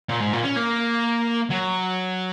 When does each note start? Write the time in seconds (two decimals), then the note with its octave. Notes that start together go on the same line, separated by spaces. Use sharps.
0.09 A#2
0.20 G#2
0.33 A#2
0.43 C#4
0.56 A#3
1.50 F#3